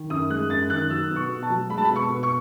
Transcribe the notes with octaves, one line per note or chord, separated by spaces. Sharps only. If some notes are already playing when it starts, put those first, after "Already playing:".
Already playing: D#3
F#2 D#6
G#3 F#6
F#2 A6
D#3 F#6
F#3 E6
B2
C#6
B2
A5
F#3
G#3 B5
A5
B5
B2
C#6
B2
C#6